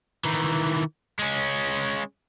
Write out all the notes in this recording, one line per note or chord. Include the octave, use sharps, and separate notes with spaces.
D#3 E3
G#3 C#4